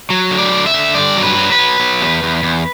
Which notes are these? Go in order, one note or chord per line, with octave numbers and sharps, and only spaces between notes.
F#3
D3
D5
D3
E5
D3
G2 D5
F#3
B4
F#3
B4
F#3
F#3
E2
E2
E2